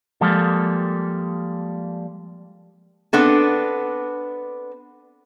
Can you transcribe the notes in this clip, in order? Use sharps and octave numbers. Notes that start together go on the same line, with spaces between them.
F3 G3 G#3 A#3 A4
B3 C4 D4 A4